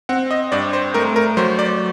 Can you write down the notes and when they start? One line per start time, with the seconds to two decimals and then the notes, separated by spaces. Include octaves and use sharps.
0.09 C4 F#5
0.31 D#5
0.52 G2 D5
0.73 C5
0.94 A3 A#4
1.16 A#4
1.37 F#3 C5
1.59 D5